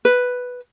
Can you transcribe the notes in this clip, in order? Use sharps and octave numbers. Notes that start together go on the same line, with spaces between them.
B4